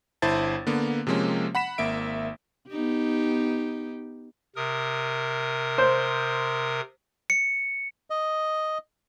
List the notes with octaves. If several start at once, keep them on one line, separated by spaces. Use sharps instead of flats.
G1 E4 C5 A5 A6
D3 A#3 B3
C3 F3 G#3 A#3 C#4
F#5 B5 B6 E7
G#1 A#3 E5 D7
B3 D#4 G4
C3 A#4 D#6
C5
C#7
D#5